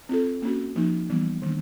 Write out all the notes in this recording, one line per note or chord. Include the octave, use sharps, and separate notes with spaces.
C4 F4 A4
A#3 C#4 F#4
F3 A#3 D#4
E3 G3 B3
D#3 G3 A#3 D4